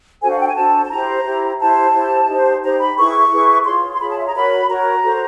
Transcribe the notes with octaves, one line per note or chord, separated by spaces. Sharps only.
D4 F#4 A4 C5 G#5
F5
G5
G#5
D4 F#4 A4 C5 A5
A5
E4 G4 C5 A#5
E4 G4 C5
E4 G4 C5 A5
E4 G4 C5
D#4 G4 C5
D#4 G4 C5 A#5
B5
E4 G#4 B4 C#6
E4 G#4 B4
F4 G#4 C#5 C6
C6
F4 G#4 C#5 B5
A5
E5
A#5
F#4 A#4 C#5 B5
F#4 A#4 C#5 A#5
F#4 A4 C5